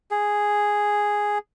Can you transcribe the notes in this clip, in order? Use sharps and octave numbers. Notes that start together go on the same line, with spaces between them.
G#4